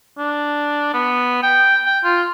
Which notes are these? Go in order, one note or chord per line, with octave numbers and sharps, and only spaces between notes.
D4
B3
G5
G5
F4